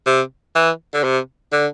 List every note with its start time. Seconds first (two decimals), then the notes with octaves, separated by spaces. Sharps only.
0.06 C3
0.55 E3
0.94 D3
1.04 C3
1.52 D3